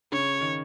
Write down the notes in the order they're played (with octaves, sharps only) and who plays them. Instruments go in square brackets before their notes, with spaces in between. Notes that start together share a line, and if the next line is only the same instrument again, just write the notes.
[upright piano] C#3 [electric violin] C#5
[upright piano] D#3